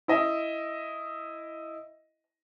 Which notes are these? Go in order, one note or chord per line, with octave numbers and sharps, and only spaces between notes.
E4 D#5 E5